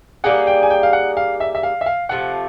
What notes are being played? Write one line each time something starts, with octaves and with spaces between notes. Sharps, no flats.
G3 A#3 D#4 G#4 F#5
G5
G#5
G5
F5
F#5
F5
E5
E5
F5
E5
F5
C3 F3 A3 F#5